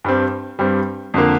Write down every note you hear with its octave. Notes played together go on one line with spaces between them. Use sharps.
G2 G3 C4
G2 G3 C4
F2 D3 A#3